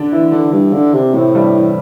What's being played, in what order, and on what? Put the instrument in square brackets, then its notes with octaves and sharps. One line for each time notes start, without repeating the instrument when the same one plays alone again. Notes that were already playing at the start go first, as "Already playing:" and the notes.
Already playing: [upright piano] D3 D4
E3 E4
[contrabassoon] D3
G2
D3
C3
[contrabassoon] A2 [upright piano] C3 C4
[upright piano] G2 G3
E3